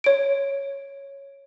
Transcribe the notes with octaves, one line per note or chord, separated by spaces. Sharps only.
C#5 D7